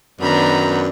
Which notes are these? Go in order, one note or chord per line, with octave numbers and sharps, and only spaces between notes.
F#2 D#3 B3 D4 A#5 B5